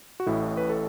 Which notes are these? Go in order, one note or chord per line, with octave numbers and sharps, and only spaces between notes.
F#4
A1 A2 A3 E4
B4
A4